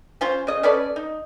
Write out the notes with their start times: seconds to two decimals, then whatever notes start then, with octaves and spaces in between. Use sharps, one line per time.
0.21 C#4 F4 C5
0.47 C#3 D#5
0.63 C#4 A4 B4 D5
0.96 D#4